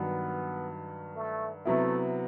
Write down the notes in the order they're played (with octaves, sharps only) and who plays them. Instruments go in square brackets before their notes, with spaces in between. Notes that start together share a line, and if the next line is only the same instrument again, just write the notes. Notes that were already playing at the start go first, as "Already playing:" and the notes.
Already playing: [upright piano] G2 D#3 F#3 [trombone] B3
[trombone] A3
[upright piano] C3 F#3 B3 E4 [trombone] A3